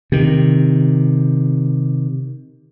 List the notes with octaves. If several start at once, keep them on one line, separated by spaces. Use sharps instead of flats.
C3 D#3